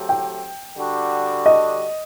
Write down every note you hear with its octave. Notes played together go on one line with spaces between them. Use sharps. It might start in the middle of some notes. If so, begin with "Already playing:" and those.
Already playing: F#3 A3 C4 G4
G5
D3 G3 D4 F#4
D#5